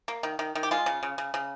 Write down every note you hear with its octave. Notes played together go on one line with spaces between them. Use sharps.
A#3
D#3
D#3
D#3
G4
G#3 F4
C#3
C#3
C#3
C#3